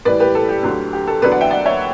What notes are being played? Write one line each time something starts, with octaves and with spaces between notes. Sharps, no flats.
A2 E3 G3 B4 D5
G4 B4
A4
G4
D2 D3 F#3
G4
A4
E2 D3 F#3 B4 D5
D5 F#5
E5 G5
D5 F#5
C#5 E5